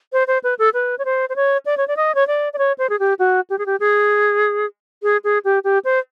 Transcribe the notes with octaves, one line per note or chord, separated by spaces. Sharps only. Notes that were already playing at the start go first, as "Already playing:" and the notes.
C5
C5
B4
A4
B4
C#5
C5
C5
C#5
D5
C#5
D5
D#5
C#5
D5
D5
C#5
C5
G#4
G4
F#4
G4
G#4
G4
G#4
G#4
G#4
G4
G4
C5